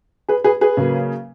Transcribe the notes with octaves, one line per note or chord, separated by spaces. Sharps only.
G#4 B4
G#4 B4
G#4 B4
C#3 F#3 A#3